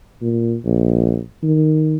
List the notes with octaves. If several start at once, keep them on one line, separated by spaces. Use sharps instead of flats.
A#2
A#1
D#3